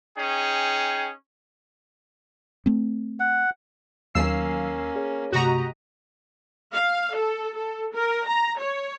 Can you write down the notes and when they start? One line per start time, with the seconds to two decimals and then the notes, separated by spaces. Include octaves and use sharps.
0.17 C#4 D#4 G#4 G5
2.66 A3 C4
3.20 F#5
4.15 D#2 F#3 A#3 C#4 F5 G#5 E6 C7
4.95 G#4 C#5
5.32 G2 C3 A3 F#4 G4 D#5 A#5
6.74 F5
7.16 A4
7.56 A4
7.94 A#4
8.27 A#5
8.59 C#5